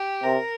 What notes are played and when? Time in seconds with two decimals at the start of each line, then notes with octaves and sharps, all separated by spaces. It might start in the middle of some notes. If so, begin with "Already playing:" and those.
Already playing: G4
0.23 C3 A#4